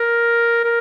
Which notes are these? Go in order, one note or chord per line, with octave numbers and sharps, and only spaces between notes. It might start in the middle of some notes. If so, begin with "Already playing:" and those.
Already playing: A#4
A#4